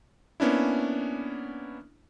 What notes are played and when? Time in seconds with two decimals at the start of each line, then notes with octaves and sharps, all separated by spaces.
0.40 A#3 B3 C#4 D4 E4